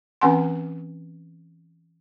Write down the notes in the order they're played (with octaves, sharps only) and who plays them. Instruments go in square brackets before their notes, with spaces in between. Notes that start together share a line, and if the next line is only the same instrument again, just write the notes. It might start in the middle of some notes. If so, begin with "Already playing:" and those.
[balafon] E3 C4 C#4 F#5 G#5 C6